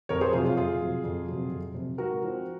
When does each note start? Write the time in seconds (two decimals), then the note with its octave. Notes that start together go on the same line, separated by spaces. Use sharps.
0.09 F2 A#4 C#5
0.21 G#4 C5
0.33 C3 F#3 F4 G#4
0.45 F4
0.57 F2 F4 G#4
0.81 C3 F#3
1.04 F2
1.28 C3 F#3
1.52 F2
1.75 C3 F#3
1.98 G#2 F#4 A#4
2.23 F3 C4